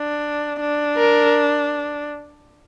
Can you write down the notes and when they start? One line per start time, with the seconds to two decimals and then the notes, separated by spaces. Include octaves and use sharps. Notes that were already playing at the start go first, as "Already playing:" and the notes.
Already playing: D4
0.61 D4
0.97 A#4